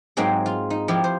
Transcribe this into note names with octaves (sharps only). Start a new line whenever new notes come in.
G#2 F#3 G#3 A#3 C4 G#4
F4
D#4
F3 E4 G4 A#4
C5